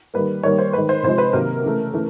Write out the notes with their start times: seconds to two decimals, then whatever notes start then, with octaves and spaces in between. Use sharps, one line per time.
0.14 D#3 G3 A#3 B4
0.43 D#3 G3 A#3 C#5
0.58 C5
0.73 D#3 G#3 B4
0.89 C5
1.03 C3 F3 G#3 C5
1.18 B4
1.33 C3 D#3 F#3 A#3 A#4
1.63 C#3 E3 A3
1.94 C#3 E3 A3